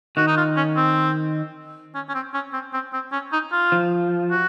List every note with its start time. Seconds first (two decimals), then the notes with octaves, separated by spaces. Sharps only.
0.17 D#3 F#4
0.27 D#4
0.37 F4
0.56 C#4
0.76 C4
1.95 C#4
2.09 C#4
2.14 C4
2.34 C#4
2.53 C4
2.73 C4
2.93 C4
3.12 C#4
3.33 D#4
3.52 F4
3.72 F3
4.31 F#4